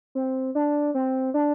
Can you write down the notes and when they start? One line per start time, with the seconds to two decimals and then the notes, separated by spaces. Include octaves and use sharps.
0.15 C4
0.55 D4
0.94 C4
1.34 D4